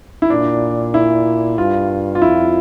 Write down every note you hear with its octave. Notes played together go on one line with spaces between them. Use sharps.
E4
A#2 D4
E4
G2 F4
F4
F2 E4